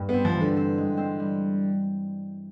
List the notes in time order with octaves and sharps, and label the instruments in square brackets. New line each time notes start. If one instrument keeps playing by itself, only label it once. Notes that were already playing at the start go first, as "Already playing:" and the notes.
Already playing: [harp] G2 A#3
[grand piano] B3 [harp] C4
[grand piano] F3
[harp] E3
[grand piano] D3
[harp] C4
G#3
C4
G3